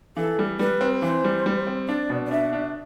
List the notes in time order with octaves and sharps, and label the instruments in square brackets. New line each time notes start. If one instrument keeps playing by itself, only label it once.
[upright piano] E3 [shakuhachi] A4
[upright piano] G3
[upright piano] G3 [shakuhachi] B4
[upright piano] C4
[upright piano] E3 [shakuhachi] C5
[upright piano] G3
G3
C4
[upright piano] D4 [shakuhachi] D5
[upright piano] B2
[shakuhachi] D5
[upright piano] D4 [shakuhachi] E5
[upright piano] D4